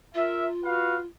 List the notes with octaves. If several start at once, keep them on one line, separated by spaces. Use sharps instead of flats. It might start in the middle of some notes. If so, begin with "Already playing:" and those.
F4 A#4 E5
F#4 B4 F5